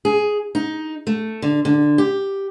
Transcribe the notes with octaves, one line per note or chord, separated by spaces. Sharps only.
G#4
D#4
A3
D3
D3
G4